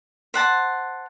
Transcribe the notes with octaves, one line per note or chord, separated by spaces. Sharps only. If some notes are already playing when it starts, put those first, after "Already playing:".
C5 F#5 A5